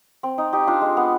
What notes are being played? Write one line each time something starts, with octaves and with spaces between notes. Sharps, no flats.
C4
D#4
D#4 G4
D4 F4
G#3
B3